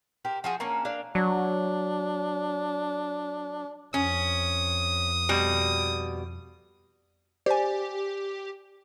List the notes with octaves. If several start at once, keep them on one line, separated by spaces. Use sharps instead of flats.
G4 A#4 C5
F3 F#4 G#4
A#3 C#4 D4
A#3 D4 F5
F#3 D4
F2 C#4 D#6
B2 G3
G4 C5 D5 G#5